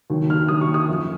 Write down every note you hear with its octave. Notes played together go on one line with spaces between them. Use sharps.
D#2 D#3 F#3
F6
D#2 D#3 F#3 D#6
C#6
D#6
F#2 F3